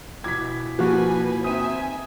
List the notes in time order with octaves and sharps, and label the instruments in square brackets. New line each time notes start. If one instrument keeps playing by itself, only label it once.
[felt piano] B2 E3 D6 [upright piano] G#6 B6
[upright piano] F3 [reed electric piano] A#3 F#4 [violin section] B4 G#5
[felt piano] C4 D#4 D#7 [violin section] E5 G#5 [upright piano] D#6